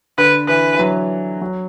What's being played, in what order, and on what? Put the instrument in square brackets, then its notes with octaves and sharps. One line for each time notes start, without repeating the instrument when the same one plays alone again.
[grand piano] D3 [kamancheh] B4
[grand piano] E3 [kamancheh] B4
[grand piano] E3
F#3
F#3